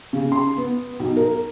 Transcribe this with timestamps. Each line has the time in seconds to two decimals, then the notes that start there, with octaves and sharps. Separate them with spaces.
0.13 C#3
0.32 C6
0.57 B3
0.99 B1
1.17 A#4